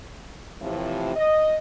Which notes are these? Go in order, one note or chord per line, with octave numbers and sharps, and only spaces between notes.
A2 C3 E3 F3
D#5